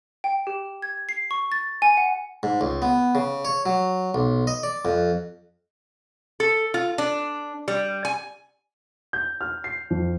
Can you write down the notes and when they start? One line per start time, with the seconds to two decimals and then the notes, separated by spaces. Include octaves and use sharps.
0.24 G5
0.47 G4
0.82 G#6
1.09 C7
1.31 C#6
1.52 A6
1.82 G#5
1.97 F#5
2.43 G#2
2.61 C#2
2.82 B3
3.15 C#3
3.45 C#5
3.66 F#3
4.14 B1
4.47 D#5
4.63 D5
4.85 F2
6.40 A4
6.74 F4
6.98 D4
7.68 G3
8.05 G#5
9.13 G6
9.41 F6
9.64 C7
9.90 F2